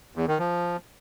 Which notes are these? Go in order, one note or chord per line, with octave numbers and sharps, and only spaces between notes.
E2
D#3
F3